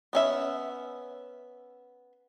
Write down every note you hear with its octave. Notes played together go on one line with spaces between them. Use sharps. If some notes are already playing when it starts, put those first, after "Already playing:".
B3 C#4 E5